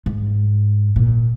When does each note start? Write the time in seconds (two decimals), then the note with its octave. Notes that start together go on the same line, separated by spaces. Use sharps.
0.06 G#2
0.96 A#2